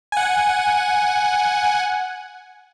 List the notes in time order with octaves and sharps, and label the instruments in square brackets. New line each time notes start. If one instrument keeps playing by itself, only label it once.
[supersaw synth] F#5 G#5